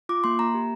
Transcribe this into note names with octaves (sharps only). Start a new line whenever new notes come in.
F4 D6
A#3 C6
A#3 A#5
G4